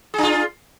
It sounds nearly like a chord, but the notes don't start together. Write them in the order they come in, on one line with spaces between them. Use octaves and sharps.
G#4 D4 F4